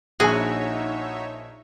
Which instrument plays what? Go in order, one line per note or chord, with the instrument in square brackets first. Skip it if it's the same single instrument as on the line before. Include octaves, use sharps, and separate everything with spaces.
[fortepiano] A#1 G#5 [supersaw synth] D#4 C#5 E5 [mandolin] F#4 [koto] G#4